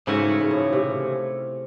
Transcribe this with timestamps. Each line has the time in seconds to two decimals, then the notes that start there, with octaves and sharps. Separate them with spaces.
0.07 G#2 C#3 E3 A3 C#4 F#4
0.40 G#2
0.51 A2
0.73 C3